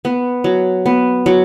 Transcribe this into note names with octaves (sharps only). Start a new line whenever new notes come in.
B3
F#3
B3
F#3